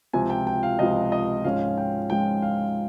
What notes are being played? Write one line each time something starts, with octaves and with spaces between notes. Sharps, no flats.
C#2 C3 F3 G#5
G5
G5
F5
C#2 C3 F3 D#5
D#5
G#2 F3 G#3 C#4 F5
G5
G#2 F3 G#3 C#4 G5
F5